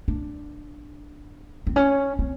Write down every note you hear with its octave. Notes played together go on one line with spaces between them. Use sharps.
D4
C4
C#4
C4